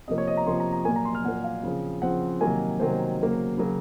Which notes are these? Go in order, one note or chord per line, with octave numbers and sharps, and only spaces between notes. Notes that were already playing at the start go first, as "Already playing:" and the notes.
C3 F3 A#3 D#5
C#5
D#5
A#5
C3 F3 A#3 C6
A#5
A#5
A#2 F#3 A#3 G#5
A#5
C6
F6
A#2 F#3 A#3 F#5
F5
C#3 F3 C4
C#3 F3 C4 F#5
C3 D#3 F#3 A#3 G#5
C3 D#3 F#3 A#3 C5
C#3 F#3 A#3
C#3 F#3 A#3